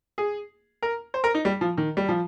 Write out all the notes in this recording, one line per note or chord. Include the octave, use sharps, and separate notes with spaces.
G#4
A#4
C5
A#4
D#4
G3
F3
D#3
G3
F3